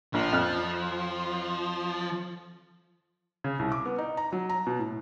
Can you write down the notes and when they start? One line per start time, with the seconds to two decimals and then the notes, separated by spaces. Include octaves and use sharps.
0.14 A#1 F3
0.33 F2 F6
3.44 C#3
3.59 C2
3.72 D6
3.86 B3
3.98 D#4
4.17 A#5
4.32 F#3
4.49 A#5
4.67 B2
4.79 A2